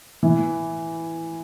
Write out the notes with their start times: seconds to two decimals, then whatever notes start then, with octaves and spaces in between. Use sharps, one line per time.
0.23 E3